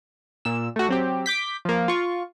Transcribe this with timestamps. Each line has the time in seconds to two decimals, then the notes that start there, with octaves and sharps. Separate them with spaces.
0.45 A#2 E6
0.76 A3 F#4
0.89 F#3 C4 G4
1.26 D6 G6 B6
1.65 F3 A#3
1.88 F4 C#6